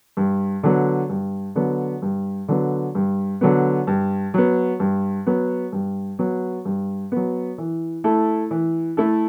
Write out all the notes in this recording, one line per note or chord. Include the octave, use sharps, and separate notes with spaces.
G2
D3 F#3 B3
G2
D3 F#3 B3
G2
D3 F#3 B3
G2
D3 F#3 B3
G2
F#3 B3
G2
F#3 B3
G2
F#3 B3
G2
F#3 B3
E3
A3 E4 A4
E3
A3 E4 A4